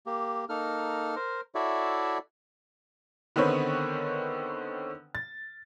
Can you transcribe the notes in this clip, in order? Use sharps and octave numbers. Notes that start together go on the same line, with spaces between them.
A#3 G4
A#3 D#4 A4 F6
A#4 C5
E4 F#4 A4 C#5 D5 E5
D3 D#3 B3 C4 B4 C#5
A6